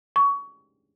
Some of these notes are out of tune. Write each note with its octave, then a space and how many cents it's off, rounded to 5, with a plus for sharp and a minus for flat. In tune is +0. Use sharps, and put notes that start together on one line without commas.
C#6 +25